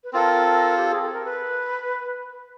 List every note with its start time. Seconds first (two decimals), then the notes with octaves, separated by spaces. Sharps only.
0.04 B4
0.13 C4 F4 A4 A#4
0.77 G4
0.90 G#4
1.02 A4
1.13 A#4
1.25 B4